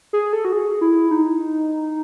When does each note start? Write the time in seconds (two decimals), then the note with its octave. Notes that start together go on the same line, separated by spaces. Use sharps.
0.13 G#4
0.33 A4
0.45 F#4
0.53 G#4
0.81 E4
1.11 D#4